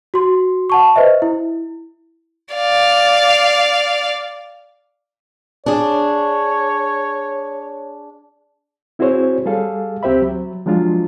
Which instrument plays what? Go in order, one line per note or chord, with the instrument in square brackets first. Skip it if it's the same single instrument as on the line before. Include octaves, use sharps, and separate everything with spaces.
[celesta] F#4 C6
F#5 A5 C#6
B4 C5 D#5 E5
E4
[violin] D5 F5
[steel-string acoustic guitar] D4 G#4 [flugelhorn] C#5
[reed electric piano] C4 E4 F#4 G#4 C5 C#5
G3 G#4 A4 F5
C#2 C4 G4 C5 E5 B5
F#3
F3 F#3 G#3 D4 F4